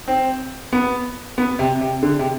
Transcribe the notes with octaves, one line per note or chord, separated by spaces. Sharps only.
C4
B3
B3
C3
C3
D3
C3